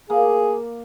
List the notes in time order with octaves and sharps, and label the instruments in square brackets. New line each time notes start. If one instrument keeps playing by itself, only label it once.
[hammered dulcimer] A#3 [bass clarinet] G#4